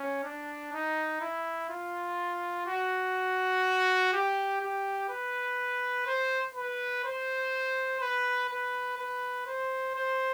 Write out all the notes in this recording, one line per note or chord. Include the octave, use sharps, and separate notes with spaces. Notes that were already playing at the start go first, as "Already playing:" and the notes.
Already playing: C#4
D4
D#4
E4
F4
F#4
G4
G4
B4
C5
B4
C5
B4
B4
B4
C5
C5